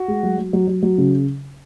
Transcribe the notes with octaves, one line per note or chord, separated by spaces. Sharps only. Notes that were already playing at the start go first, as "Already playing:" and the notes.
Already playing: F#4
G#3
F#3
F#3
F#3
F#3
F#3
C#3